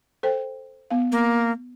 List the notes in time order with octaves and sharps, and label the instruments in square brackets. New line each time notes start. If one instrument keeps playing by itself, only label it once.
[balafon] A4 C5 G5
B3 F5
[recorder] A#3